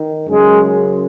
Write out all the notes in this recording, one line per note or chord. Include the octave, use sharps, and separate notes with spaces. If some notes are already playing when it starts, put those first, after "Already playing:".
Already playing: D#3
F#2 C#3 G#3